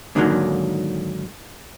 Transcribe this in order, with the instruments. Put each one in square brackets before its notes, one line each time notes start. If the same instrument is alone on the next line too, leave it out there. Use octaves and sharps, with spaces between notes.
[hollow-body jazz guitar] G#2 D3 D#3 F3 F#3 A#3